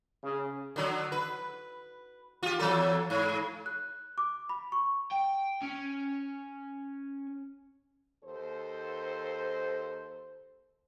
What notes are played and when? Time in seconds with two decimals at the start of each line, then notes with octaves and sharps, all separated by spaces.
0.23 C#3
0.76 D3 F#3
1.12 B4
2.43 F4 G4
2.59 E2 F#3 A4
3.10 G#2
3.66 F#6
4.18 D6
4.49 B5
4.72 C#6
5.11 G5
5.62 C#4
8.24 D#2 A4 C5